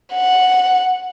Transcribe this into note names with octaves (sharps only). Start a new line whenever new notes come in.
F#5